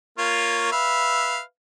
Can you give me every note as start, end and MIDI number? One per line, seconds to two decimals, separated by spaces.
0.18 0.71 58
0.18 0.71 65
0.18 0.71 73
0.72 1.40 71
0.72 1.40 76
0.72 1.40 77